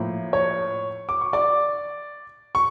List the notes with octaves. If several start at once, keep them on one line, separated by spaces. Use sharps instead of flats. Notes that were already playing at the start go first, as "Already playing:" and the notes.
Already playing: A2 F3 A#3
C#5 C#6
D6
C#6
D5 D6
C#6